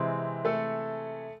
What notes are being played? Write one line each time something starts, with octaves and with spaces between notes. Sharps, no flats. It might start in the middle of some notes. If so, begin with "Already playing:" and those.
Already playing: C3 E3 G#3 C4
A3 A4